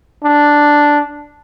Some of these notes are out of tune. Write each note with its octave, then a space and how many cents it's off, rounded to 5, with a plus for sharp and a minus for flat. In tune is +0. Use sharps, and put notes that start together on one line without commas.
D4 +0